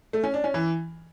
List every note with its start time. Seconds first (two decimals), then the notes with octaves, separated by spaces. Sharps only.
0.13 A3
0.24 C#4
0.34 D4
0.44 C#4
0.54 E3